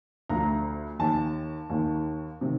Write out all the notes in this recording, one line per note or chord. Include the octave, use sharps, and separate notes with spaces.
D2 D3 F3 A#5
D#2 D#3 A5
D#2 D#3
C3 D#3